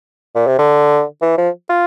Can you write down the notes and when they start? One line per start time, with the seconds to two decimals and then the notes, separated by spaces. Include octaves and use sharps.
0.35 A#2
0.47 C3
0.59 D3
1.22 E3
1.38 F3
1.70 F4